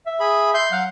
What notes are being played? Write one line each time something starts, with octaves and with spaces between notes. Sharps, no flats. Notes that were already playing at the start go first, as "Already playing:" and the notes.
E5
G#4 B5
E5 C6 G6
F#3 F5 F#5